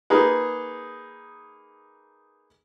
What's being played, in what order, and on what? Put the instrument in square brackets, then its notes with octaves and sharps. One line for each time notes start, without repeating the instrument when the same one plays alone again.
[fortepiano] A#3 D#4 G#4 B4